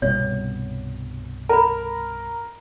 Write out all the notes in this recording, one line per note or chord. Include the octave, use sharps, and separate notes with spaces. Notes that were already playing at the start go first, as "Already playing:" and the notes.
C2 G2 B2 C#5
A#4 A#5 B5